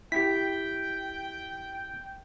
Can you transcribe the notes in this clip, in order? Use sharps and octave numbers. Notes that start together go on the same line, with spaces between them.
E4 G4 G5 B6